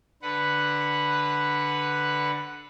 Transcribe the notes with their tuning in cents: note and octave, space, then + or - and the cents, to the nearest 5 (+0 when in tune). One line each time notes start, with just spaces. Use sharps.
D3 +0 B4 +0 F#5 +0